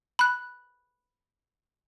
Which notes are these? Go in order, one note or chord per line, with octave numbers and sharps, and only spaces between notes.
B5 F#6